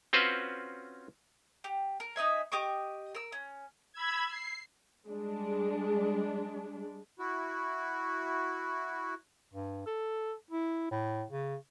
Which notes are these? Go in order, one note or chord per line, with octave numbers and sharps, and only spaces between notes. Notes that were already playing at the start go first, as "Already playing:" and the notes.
C4 C#4 F4 F#4 B4 C5
G4
A#4
D#4 D#5 E5 G#5
G4 D#5 C#6 D6
A#4 E6
C#4
B5 E6 G#6
C7
G3 G#3 D4
E4 F#4
G2
A4
E4
A2
C#3